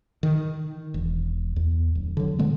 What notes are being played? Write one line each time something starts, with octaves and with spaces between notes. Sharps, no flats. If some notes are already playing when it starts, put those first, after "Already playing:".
D#3
E1
E2
D1
D3 F#3
B2 D3 G#3 B3